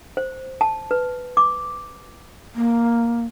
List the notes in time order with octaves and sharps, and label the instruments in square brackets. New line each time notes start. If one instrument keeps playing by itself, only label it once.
[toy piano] C5
A5
B4
D6
[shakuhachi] A#3